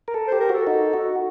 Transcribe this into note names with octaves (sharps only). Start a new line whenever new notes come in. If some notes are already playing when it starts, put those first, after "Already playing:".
A#4
A4
C5
G4
A#4
F#4 A4
D#4
F#4